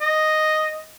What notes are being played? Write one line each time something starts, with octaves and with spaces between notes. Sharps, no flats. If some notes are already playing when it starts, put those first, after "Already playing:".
D#5